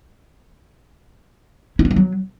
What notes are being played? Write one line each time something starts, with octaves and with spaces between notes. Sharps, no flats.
E4
D4
E3
F#3